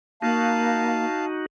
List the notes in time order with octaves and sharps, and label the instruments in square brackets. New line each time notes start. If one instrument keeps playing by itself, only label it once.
[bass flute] A#3 [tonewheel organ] D#4 F#4 [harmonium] F5 A5